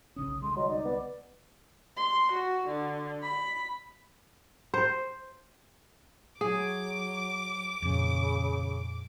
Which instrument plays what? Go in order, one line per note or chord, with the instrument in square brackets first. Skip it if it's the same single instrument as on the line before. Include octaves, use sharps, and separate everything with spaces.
[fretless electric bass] B1 C#3 C#4 [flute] D#6
[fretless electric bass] C2 D3 G#3 [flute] C6
[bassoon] F#3 [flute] D#5
[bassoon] D#4 [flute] D5
[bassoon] B3 [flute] D5
[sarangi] C6
F#4
D3
B5
[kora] C5
[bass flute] F#3 [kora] G#4 [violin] D6
[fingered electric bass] F2 A#2 [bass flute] C#3